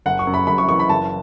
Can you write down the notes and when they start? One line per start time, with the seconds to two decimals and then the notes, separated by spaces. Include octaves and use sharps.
0.06 F#1 F#5
0.19 C#6
0.27 F#2
0.34 B5
0.47 F#1 B5
0.58 C#6
0.68 E3 C#6
0.80 B5
0.89 F#1 A5